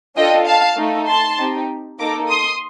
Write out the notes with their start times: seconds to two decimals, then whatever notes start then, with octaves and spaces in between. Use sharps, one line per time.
0.16 D4 F4 A4 D#5 G5
0.46 F5 A5
0.77 A3 D#4 A4
1.07 A5 C6
1.38 C4 D#4 G4
1.99 A#3 D#4 A4 A#5 D6
2.29 C6 D#6